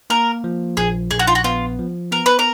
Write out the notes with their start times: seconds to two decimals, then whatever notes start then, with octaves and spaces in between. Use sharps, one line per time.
0.10 A#3 A#4
0.44 F3
0.77 A#1 G#4
1.11 A#1 G#4
1.19 F#4
1.27 F4
1.35 F#4
1.44 B3 F4
1.79 F3
2.12 B3 A#4
2.26 B4
2.39 A#4